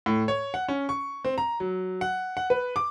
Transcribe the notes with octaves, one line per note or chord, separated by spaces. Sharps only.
A2
C#5
F#5
C#4
C#6
C4
A#5
F#3
F#5
F#5
B4
D6